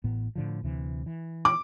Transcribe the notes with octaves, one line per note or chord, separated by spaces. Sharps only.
A1 A2 B3
A2 D3 F3
D2 C3 E3
E3
D6